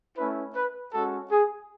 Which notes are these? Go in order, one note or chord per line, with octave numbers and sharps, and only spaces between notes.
A3 C#4 E4 B4
B4
G#3 C#4 F#4 A4
G#4